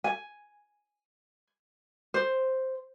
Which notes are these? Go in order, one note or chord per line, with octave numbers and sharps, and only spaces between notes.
G#5
C5